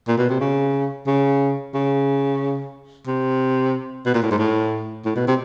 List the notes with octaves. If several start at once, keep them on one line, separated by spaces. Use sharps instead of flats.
A#2
B2
C3
C#3
C#3
C#3
C3
B2
A#2
A2
G#2
A2
A2
B2
C3